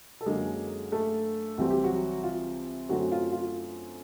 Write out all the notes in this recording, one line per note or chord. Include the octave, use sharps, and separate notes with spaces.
A4
F#2 D3 F#3 G#3 A#3 G#4
A3 A4
C2 C3 E3 G3 C4 F#4
G4
F#3 F#4
F4
F#2 D3 F#3 A3 C4 F#4
F4
F4